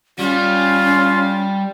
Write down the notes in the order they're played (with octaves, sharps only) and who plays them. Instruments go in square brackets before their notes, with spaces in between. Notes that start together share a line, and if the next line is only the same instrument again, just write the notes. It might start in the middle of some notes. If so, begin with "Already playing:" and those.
[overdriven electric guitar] G3 [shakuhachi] C#4 [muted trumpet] F4